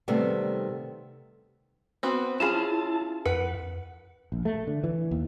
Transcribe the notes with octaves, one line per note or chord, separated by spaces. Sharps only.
C3 D#3 G3 A3 B3
B3 C4 F#4
C#4 E4 F4 G#4 A5
F2 B4 F#5
A#1
A3
D3
E3
D#2